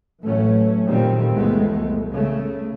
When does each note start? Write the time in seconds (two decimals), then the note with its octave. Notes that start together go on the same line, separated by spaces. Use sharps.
0.22 A1 E3 F#3 A3 C#4
0.86 F#2 A#2 D#3 G3 A3 C4
1.32 F1 C#2 E3 G#3 A3 B3
1.79 C2
2.12 C#3 A3